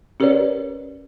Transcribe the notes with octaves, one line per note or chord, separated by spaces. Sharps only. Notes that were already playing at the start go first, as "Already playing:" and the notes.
C#4 G4 A#4 B4 C#5 D5